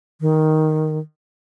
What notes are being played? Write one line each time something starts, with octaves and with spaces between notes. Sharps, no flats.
D#3